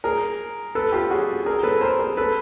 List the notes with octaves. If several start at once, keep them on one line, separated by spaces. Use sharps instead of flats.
G#4 A#4
A4 B4
F4 G4
F#4 G#4
G#4 A#4
A4 B4
A#4 C5
G#4 A#4
A4 B4